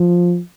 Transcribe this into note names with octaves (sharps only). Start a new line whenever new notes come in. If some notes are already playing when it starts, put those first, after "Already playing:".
Already playing: F3